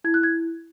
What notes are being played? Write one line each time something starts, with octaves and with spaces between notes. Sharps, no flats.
E4 G#6
F#6
G#6